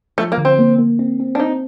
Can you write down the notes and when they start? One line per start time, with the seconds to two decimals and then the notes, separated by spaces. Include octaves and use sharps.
0.18 F3 A3
0.32 A#3
0.38 D3
0.45 C4
0.59 A#3
0.79 A#3
0.99 C4
1.20 C4
1.35 D4
1.40 C4 D#4